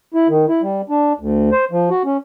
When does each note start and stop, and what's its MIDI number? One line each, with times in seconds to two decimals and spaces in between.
0.14 0.28 64
0.29 0.45 51
0.48 0.62 64
0.62 0.81 55
0.89 1.13 62
1.20 1.50 38
1.52 1.65 72
1.71 1.90 53
1.90 2.03 66
2.05 2.17 61